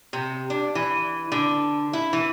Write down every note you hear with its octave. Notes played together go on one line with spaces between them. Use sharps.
C3
D4
E3
D3
E4
E3